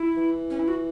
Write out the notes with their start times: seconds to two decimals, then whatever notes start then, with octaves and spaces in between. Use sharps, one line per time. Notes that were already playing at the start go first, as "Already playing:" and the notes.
Already playing: E4
0.17 E3
0.50 C#4
0.59 E4
0.68 F#4